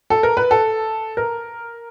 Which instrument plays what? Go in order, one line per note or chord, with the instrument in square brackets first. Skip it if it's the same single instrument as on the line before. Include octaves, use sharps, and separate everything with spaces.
[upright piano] A4
A#4
B4
A4
A#4